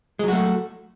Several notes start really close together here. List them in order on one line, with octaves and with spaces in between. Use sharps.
G#3 F#3 F#4 A3